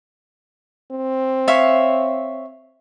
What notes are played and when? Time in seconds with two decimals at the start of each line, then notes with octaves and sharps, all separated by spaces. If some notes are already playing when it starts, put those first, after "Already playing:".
0.91 C4
1.48 C#5 E5 F5